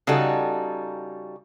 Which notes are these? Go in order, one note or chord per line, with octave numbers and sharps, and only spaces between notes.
C#3 G3 D#4 F#4 A4